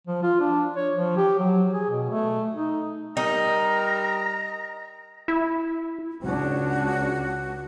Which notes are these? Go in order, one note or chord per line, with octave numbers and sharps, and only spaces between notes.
F3
F4
D4
C#5
F3
G4
F#3
G#4
B2
A3
D#4
G3 D#4 A#4 A#5
E4
C#2 C#4 D4 F#4